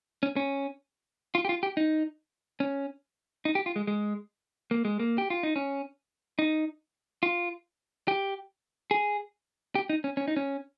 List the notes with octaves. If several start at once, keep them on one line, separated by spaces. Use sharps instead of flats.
C#4
C#4
F4
G4
F4
G4
D#4
C#4
D#4
G4
F4
G#3
G#3
A#3
G#3
A#3
G4
F4
D#4
C#4
D#4
F4
G4
G#4
G4
D#4
C#4
C#4
D#4
C#4